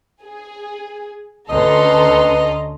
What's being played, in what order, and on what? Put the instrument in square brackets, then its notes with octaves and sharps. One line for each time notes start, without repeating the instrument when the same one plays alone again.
[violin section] G#4
[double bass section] D2 D3 C#4 [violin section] A4 A#5 C6 [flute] B4 [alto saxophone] D#5